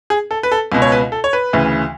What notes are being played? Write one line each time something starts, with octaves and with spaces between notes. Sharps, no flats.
G#4
A4
B4
A4
C#2 B2
C#5
B4
A4
C#5
B4
D2 C#3 E3